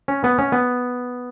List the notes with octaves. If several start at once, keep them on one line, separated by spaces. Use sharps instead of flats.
C#4
B3
C#4
B3